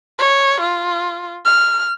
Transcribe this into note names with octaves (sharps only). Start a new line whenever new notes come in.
C#5
F4
F6